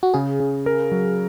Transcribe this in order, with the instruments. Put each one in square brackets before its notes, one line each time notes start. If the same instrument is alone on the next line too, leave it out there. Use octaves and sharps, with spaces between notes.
[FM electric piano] F#4
[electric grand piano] C#3 [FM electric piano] G#4
[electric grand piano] C#3
A#4
F#3